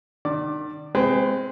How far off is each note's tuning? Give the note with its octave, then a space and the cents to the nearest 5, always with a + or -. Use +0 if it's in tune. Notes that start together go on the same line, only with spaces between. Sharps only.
D#3 -40 D5 +5
G#3 +0 C4 +0 B4 +35